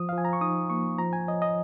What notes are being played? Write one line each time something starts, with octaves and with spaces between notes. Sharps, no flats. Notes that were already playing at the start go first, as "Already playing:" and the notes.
Already playing: F3 D#6
F5
F3
G#5
A#5
C#6
D#4 D#6
A#3 C#6
F3 A#5
G#5
C#5 D#5
D#5